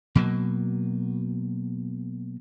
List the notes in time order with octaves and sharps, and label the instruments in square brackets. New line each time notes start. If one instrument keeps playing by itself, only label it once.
[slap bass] B2 F#3 A#3